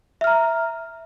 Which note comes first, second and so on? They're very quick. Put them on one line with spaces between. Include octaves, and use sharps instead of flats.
E5 F6 A#5